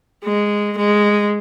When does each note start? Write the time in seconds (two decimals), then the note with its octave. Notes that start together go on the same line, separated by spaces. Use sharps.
0.25 G#3
0.77 G#3